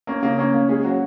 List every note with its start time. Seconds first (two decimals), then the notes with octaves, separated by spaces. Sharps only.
0.07 A#3 C#4
0.23 C#3 A#3
0.38 A#3 C#4
0.54 A#3
0.69 G#3 C#4 G#4
0.84 F#3 F#4